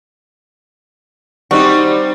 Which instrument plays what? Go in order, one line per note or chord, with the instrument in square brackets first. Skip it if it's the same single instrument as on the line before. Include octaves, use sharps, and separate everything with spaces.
[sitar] G3 C4 D#4 [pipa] F#4